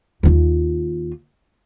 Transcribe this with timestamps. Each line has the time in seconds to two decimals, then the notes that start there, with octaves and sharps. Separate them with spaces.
0.23 D#2 F4